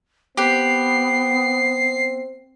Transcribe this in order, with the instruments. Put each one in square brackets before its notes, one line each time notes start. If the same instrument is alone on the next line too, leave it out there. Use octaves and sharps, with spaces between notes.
[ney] B3 [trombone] C4 [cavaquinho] G4 B4 [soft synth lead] C7